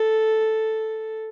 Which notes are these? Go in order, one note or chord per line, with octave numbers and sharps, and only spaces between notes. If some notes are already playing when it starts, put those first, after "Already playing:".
Already playing: A4